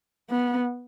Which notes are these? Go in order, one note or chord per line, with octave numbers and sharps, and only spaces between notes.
B3